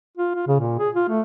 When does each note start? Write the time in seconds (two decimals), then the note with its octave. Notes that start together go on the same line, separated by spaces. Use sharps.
0.17 F4
0.36 F4
0.47 C#3
0.60 A#2
0.79 G#4
0.95 F4
1.09 A3